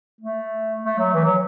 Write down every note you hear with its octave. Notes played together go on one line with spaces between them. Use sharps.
A3
A3
F#3
E3
F#3